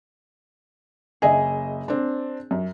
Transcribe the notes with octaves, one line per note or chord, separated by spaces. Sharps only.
F#1 G#4 D#5 E5
C4 D4
F#2